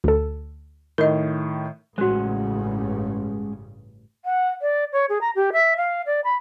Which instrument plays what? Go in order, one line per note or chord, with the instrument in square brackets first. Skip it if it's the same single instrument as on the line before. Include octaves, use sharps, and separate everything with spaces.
[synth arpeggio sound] D2 A4
[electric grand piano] A2 D#3 [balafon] A#4 D#5
[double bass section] A1 G2 C#3 [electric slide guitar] G#3 C#4 F#5 [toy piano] F#4 C5
[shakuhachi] F#5
D5
C#5
G#4
A#5
G4
E5
F5
D5
B5